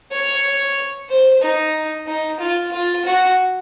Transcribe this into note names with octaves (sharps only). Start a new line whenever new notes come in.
C#5
C5
D#4
D#4
F4
F4
F#4